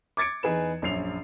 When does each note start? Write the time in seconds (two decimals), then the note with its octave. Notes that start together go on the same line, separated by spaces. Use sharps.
0.17 D6 G#6 A6 C#7 D7
0.43 E2 D#4 G#4 B4 E7
0.82 A#1 F#2 C7 F7